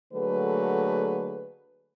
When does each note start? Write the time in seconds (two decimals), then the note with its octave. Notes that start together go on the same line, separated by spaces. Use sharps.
0.13 D3 F#3 A3 A#3 G#4 B4